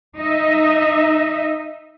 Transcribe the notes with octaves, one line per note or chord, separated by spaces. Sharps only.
D#4 D#5 E5